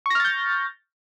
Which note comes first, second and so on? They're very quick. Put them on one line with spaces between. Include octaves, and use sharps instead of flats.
C#6 A#6 F6 A6 G6